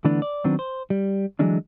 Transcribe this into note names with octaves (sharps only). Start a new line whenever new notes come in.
D3 E3 A3 B3 D4
D5
D#3 F#3 B3 C4 D4
C5
G3
D3 E3 F#3 G#3 C#4 D4